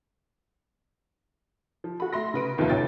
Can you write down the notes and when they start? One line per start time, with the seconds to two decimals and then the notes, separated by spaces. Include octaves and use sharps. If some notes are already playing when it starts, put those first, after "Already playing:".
1.84 F3
2.00 F#4 B5
2.13 A3 E5 C6 A#6
2.34 C#3 B4 D7
2.58 F1 D#2 F3 B3 F4 E5
2.70 A1 D2 C#5 G5 A6